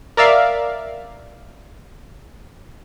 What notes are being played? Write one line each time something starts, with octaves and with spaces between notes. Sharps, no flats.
A#4 D5 E5 F5